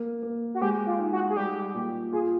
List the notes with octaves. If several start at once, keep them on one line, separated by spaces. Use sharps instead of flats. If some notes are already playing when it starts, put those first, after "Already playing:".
Already playing: A#3
A#3
F#4
G#3 G4
F4
D#4
F#4
G#4
G3 G4
A#2
F4 G#4